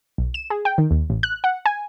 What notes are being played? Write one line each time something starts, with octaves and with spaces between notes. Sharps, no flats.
B1
E7
G#4
G5
D#3
D#2
A1
F#6
F#5
G#5